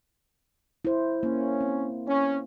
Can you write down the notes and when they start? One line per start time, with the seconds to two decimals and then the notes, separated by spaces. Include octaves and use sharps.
0.85 E4 C5
1.23 A#3 C#4
1.61 C4
2.06 C#4